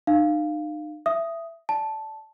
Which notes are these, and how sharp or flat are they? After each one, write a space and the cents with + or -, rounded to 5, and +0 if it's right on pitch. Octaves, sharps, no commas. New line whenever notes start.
D#4 -40 F5 +0
E5 +15 D#6 +0
D5 -5 A5 -5